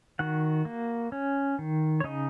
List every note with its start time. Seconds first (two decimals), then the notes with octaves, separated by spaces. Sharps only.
0.19 D#3 F#4 F#5
0.65 A#3
1.12 C#4
1.59 D#3
2.00 C#5
2.04 C#3 D#4 D#5